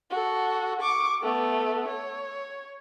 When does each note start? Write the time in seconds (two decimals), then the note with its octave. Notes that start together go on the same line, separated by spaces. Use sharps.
0.11 F#4 A4
0.81 C#6 D6
1.23 A3 B3
1.88 C#5